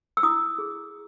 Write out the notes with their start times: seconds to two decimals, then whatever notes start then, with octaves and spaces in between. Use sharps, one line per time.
0.17 E6
0.23 E4 D#6
0.58 G#4